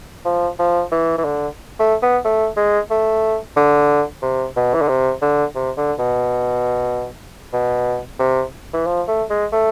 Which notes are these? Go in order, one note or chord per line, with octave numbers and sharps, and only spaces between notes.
F3
F3
E3
E3
D3
A3
B3
A3
G#3
A3
D3
C3
B2
E3
D3
C3
D3
C3
D3
B2
B2
C3
E3
F3
A3
G#3
A3